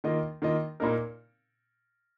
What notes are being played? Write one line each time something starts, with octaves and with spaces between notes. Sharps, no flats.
D#3 A#3 F4 D#5
D#3 A#3 F4 D#5
A#2 A#3 D#4 A#4